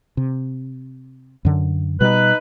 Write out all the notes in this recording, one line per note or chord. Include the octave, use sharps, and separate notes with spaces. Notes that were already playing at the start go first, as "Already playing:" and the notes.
C3
F#2 D3
B2 G3 D#4 B4